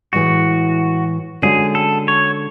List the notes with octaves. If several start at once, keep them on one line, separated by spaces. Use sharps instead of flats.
A2 E3 G#3 F#4
D3 G#3 C#4 F#4 G#4
A4
C#5